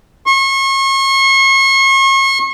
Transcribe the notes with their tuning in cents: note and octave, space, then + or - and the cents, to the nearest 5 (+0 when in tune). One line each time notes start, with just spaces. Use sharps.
C#6 -40